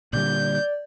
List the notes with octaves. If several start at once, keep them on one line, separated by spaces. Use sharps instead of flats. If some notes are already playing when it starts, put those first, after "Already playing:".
A#2 D3 G3 D5 G6